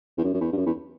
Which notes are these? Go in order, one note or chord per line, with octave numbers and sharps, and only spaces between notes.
E2
F#2
F#2
E2
G2
F#2
E2